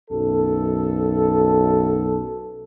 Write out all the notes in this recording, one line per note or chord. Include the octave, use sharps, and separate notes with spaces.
B1 F#2 A4